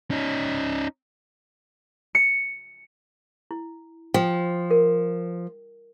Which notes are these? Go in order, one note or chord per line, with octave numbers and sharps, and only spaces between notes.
C#4 D#4
C#7
E4
F3 G5
A#4